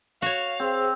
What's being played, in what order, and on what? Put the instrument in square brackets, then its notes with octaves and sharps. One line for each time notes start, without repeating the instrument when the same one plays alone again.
[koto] F#4 C#5 [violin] F5
[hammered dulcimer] C4 [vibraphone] G#4 C5